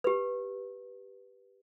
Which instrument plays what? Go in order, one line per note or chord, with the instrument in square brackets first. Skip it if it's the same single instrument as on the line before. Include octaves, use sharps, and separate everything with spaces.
[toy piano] G4 B4